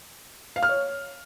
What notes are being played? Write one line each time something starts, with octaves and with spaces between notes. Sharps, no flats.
F5
F6
C#5